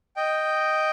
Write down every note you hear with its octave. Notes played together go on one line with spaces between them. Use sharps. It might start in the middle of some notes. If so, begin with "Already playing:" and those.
D#5 G5